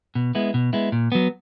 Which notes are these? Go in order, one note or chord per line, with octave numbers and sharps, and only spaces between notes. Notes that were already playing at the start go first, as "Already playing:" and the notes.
B2
G#3 B3 E4
B2
G#3 B3 E4
A#2
F#3 B3